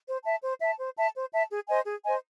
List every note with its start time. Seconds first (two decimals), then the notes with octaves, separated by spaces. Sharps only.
0.07 C5
0.25 E5 A5
0.43 C5
0.61 E5 A5
0.78 C5
0.97 E5 A5
1.15 C5
1.32 E5 A5
1.51 G#4
1.69 C5 D#5 G#5
1.86 G#4
2.04 C5 D#5 G#5